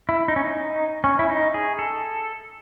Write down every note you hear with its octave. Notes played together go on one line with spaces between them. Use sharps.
E4
D#4
C#4
D#4
C#4
E4
D#4
G#4
A4